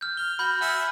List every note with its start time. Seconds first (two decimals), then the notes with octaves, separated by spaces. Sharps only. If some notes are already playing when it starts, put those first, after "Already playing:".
0.01 F6 G6
0.17 F6 G7
0.39 F#4 B5 G6
0.61 E5 F#5 G#5 F6